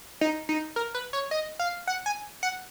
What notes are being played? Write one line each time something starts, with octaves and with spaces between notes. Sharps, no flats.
D#4
D#4
A#4
B4
C#5
D#5
F5
F#5
G#5
F#5